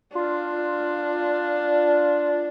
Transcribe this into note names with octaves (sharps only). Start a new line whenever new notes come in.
D4 F4